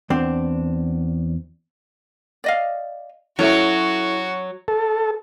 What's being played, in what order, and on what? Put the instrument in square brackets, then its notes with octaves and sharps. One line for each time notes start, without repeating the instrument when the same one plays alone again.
[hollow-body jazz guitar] E2 C4 D4
[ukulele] D5 D#5 F5
[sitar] F#3 [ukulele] C#4 C#5 [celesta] E4 A4 E5 [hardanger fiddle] F#4
[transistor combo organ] A4